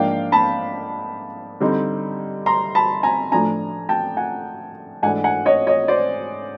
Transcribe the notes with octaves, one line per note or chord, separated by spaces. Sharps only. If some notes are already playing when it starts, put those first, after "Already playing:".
Already playing: G#2 F3 A#3 D4 F5 G5
A5 B5
D3 G3 C4 D#4
A#5 C6
A5 B5
G#5 A#5
A2 F3 A3 D4 G#5 A#5
G5 A5
F#5 G#5
G#2 E3 A3 D4 F#5 G#5
F#5 G#5
C#5 D#5
C#5 D#5
C5 D5